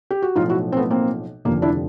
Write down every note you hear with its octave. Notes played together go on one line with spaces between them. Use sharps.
G4
F#4
B1 A2 F3 D#4 F4
E4 F#4
C4
A3 B3
A#3 C4
F1 D#2 D3 F3 A#3
D4 E4